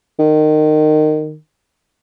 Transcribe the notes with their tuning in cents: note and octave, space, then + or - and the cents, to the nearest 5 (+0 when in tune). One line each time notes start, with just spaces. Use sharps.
D#3 -20